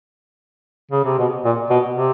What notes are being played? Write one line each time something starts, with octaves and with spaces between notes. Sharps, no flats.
C#3
C3
B2
A#2
B2
C3